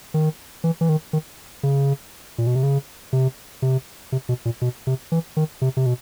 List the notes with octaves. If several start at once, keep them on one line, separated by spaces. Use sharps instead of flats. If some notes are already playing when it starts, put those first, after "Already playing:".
D#3
E3
E3
D#3
D#3
C#3
A#2
B2
C3
C#3
C3
C3
C3
B2
A#2
B2
C3
E3
D#3
C3
C3
B2